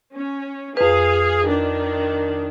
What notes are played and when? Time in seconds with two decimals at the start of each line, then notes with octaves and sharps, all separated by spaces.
0.14 C#4
0.77 F2 G#4 B4 F5
1.44 D#3 D4